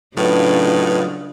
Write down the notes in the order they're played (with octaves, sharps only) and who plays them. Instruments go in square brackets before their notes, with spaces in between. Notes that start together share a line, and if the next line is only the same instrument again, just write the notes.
[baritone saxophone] A2 [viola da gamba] C#3 D4 [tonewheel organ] F#3 F4 D#5 [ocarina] B4